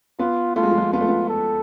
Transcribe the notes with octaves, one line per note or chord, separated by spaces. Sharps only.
B3 F4
A3 F4
G#3
F3
G#3
B3 F4
A3
B3
A4